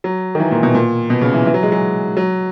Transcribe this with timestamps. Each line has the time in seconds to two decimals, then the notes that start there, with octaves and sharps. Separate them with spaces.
0.04 F#3
0.35 D#3
0.40 E3
0.51 A#2
0.63 B2
0.75 A#2
1.10 B2
1.21 C#3
1.34 E3
1.45 E3
1.54 F#3
1.63 G#3
1.72 F#3
2.17 F#3